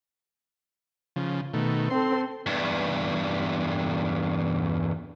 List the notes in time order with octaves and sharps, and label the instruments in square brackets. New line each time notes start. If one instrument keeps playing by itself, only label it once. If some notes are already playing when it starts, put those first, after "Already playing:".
[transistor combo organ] C#3 F3
B2 D#3 A3
[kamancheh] C4 A4 [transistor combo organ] C6
[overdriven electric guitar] E2 G2